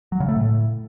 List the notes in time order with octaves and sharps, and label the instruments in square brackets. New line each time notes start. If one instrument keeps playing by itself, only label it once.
[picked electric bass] F#3
C#3
A3
A2